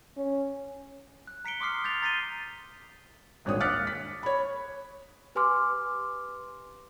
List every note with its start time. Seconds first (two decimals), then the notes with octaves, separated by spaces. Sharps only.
0.17 C#4
1.27 F#6
1.45 A#5 B6 C#7 D7 G7
1.61 C6 D6 D#6 F6 C7
1.84 G6 A6 B6 F7
2.02 A#5 A6 B6 C7 D#7 G7
3.45 D#1 G#1 D4 C#5 D#6
3.60 D6 F6 F#6 A6 B6 C#7
3.87 B6
4.23 C#5 B5
5.35 G4 B4 G#5 C6 D6 F6